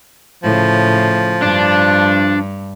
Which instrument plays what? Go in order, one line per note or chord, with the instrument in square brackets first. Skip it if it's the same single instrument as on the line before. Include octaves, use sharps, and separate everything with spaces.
[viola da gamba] A2 C#3 [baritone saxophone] F3
[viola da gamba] G2 [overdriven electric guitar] D4